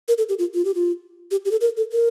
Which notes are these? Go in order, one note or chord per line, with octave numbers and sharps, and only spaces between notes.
A#4
A4
G4
F4
F4
G4
F4
G4
G4
A4
A#4
A4
A#4